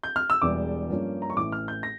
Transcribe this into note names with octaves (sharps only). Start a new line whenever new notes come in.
G6
F6
E6
E1 E2 E3 G3 D6
G2 F3 A#3 C#4
A#5
C#6
A1 A2 E3 D6
F6
G6
A#6